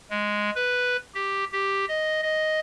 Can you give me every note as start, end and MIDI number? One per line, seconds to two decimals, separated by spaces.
0.10 0.50 56
0.56 0.97 71
1.14 1.44 67
1.52 1.85 67
1.89 2.22 75
2.23 2.60 75